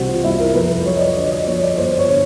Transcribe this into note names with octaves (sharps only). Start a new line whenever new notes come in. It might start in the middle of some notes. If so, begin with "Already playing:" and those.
Already playing: C2 C3 E3 F#4 C5
F4
C2 E4
A#4
F2 B4
F#3 C#5
D#5
D5
D3 D#5
D#5
F2 C#5
D5
G1 C5
C#5
D3